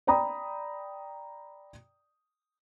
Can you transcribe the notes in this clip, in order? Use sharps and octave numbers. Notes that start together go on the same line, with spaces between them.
D5 G5 A#5 B5 D#6